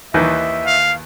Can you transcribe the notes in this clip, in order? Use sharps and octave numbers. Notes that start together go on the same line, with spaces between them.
D#2 D#3 E3 E5
F5